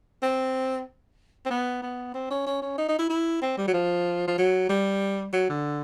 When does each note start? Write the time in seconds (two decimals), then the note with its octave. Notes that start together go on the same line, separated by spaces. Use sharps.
0.23 C4
1.46 C4
1.51 B3
1.82 B3
2.14 C4
2.31 C#4
2.46 C#4
2.62 C#4
2.78 D#4
2.89 D#4
2.99 E4
3.10 E4
3.42 C4
3.58 G3
3.67 F#3
3.74 F3
4.28 F3
4.38 F#3
4.69 G3
5.33 F#3
5.49 D3